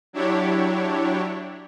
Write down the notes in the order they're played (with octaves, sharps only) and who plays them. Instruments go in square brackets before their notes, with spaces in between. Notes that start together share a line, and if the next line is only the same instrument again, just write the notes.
[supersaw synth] F#3 D4 E4 G4 C#5